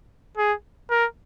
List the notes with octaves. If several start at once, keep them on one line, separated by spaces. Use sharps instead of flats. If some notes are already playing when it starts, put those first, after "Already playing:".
G#4
A#4